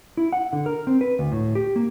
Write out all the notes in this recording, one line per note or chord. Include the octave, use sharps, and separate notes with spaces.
E4
F#5
D3
A#4
C4
B4
D2
A2
G4
A#3